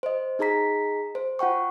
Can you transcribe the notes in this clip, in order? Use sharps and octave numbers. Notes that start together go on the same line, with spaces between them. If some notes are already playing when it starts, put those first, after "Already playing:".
C5 D#5
D#4 G#4 D#5 A#5 B6
C5
F4 F#5 G5 C#6